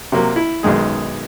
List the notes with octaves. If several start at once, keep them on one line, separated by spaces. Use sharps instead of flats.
C3 F#3 A#3
E4
B1 F#2 D#3 G#3 G#4